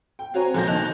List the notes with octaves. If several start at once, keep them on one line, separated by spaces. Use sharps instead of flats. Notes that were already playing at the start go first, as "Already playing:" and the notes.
G5
C4 F#4 C#5 G#5 A#5
A#1 A#2 F3 A#3 G6 A#6
D#2 D#5 A5 F#6 F7